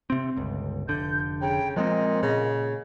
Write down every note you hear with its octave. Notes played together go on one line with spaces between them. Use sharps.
C3 C4
G1 C#2
F1 D3 G6
C#3 G5
A#2 F3 G#3 C4 D#5
A#2 C#3